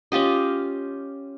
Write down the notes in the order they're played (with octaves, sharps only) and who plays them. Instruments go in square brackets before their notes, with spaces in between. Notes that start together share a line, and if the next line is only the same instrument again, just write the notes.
[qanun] C#4 F4 G4 D#5